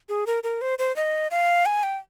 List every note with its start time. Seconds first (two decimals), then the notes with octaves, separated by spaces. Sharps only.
0.09 G#4
0.27 A#4
0.43 A#4
0.61 C5
0.79 C5
0.96 D#5
1.31 F5
1.66 G#5
1.83 G5